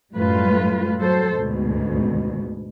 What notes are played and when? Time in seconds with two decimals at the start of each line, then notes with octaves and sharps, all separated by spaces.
0.14 F#2 A2 G3 A3 F4 B4
1.00 F#3 A4 C5
1.37 D2 G#2 B2